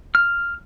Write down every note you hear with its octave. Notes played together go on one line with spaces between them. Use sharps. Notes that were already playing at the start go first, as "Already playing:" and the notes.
F6